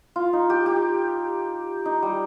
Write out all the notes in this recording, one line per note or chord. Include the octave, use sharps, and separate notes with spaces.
F4
D#4
G4
G4
D#4
G3